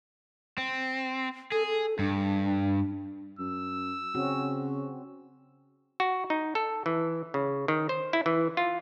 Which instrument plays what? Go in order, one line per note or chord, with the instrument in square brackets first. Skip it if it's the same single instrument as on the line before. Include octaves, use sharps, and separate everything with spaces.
[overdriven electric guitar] C4
[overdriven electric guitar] G#4 [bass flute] A4
[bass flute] A4
[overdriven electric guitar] G2 [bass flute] D4
[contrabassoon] F#2 [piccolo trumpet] E6
[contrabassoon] C#3 [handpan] C4 C#4 F#4
[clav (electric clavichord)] F#4
D#4
A4
E3
C#3
D#3
C5
E4
E3
F4